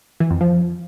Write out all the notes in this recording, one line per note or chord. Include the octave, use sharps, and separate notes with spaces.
E3
F2
F3